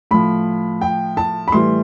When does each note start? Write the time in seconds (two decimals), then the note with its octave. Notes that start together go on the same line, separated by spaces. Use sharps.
0.11 A2 F3 B5
0.81 G5
1.17 A5
1.48 B5
1.52 A2 E3 G3 C6